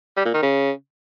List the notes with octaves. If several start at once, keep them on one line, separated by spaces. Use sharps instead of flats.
G3
A#2
D#3
C#3